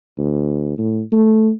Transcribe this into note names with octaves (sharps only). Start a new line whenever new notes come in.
D2
A2
A3